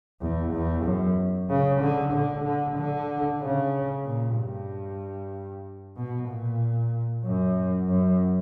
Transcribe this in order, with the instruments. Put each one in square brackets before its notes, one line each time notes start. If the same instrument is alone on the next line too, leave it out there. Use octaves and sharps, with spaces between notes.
[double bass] E2
E2
F#2
C#3
D3
D3
D3
D3
C#3
A#2
G2
B2
A#2
F#2
F#2